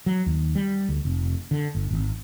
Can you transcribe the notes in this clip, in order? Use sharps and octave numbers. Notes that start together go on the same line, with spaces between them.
F#3
D#2
G3
D2
F1
D3
G1
G#1